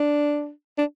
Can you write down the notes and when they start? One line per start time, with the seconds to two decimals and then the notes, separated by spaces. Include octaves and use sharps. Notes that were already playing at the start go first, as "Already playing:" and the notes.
Already playing: D4
0.78 D4